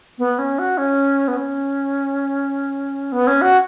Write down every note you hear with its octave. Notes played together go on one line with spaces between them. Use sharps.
B3
C#4
F#4
C#4
B3
C#4
B3
C#4
F#4